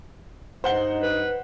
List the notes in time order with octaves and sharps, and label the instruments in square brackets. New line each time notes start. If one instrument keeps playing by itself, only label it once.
[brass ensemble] G2 D#4 [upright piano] C5 F#5 G7
[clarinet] B4